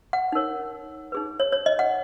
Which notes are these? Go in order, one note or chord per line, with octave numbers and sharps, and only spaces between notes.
F#5
D#4 A#4 C#5
D#4 G#4 B4
C#5
C#5
D#5
F#5